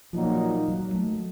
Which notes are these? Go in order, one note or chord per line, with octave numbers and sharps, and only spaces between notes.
A#2 F3 F#3 A#3 D#4
F#3
A3